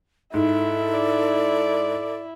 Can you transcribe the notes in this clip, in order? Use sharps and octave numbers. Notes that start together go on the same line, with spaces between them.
G#2 E4 A4
D5